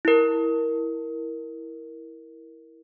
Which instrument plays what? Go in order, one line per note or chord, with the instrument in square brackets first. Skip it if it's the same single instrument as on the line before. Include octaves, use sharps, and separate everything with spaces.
[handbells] E4 A#4